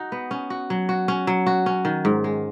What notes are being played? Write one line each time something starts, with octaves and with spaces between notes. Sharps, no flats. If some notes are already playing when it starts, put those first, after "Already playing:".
Already playing: D#4 F#4
B3
C#4
F#4
F#3
F#4
C#4
F#3
F#4
C#4
D#3
G#2
G#3